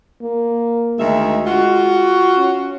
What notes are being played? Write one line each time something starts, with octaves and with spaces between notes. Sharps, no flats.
A#3
D2 D#3 G#3 E5
F4 F#4
C#4